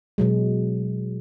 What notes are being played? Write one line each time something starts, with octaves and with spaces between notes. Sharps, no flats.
B2 F#3 G#3